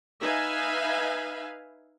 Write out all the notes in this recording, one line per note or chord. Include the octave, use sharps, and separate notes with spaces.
D#4 B4 E5 F5 G#5